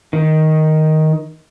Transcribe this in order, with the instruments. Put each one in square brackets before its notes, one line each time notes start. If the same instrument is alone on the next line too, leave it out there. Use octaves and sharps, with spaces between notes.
[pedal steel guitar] D#3